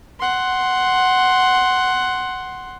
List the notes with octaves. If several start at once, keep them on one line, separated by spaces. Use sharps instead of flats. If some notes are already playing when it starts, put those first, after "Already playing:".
F#5 C6